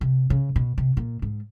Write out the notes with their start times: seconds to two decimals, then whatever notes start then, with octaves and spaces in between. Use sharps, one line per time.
0.01 C3
0.30 C#3
0.56 B2
0.78 C3
0.97 A#2
1.22 G#2